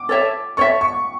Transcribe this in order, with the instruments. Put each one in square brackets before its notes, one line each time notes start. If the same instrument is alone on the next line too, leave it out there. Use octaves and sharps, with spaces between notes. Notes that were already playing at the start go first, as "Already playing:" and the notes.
Already playing: [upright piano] D6
[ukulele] A4 C#5 E5
[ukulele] A4 C#5 E5 [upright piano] C#6
[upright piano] C#6